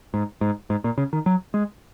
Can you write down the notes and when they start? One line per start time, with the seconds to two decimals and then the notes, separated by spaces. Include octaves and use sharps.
0.14 G#2
0.41 G#2
0.70 G#2
0.84 A#2
0.98 C#3
1.13 D#3
1.26 F#3
1.54 G#3